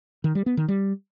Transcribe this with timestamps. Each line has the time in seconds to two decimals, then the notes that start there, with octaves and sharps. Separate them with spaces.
0.24 D#3
0.35 G3
0.46 B3
0.57 D#3
0.68 G3